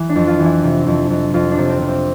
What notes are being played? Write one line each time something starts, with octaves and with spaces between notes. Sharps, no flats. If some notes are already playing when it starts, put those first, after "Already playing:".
Already playing: E3
D4
F2
F4
E3
E4
C3
F2
F2
F2 F4
D4
C3
C4
C3
C4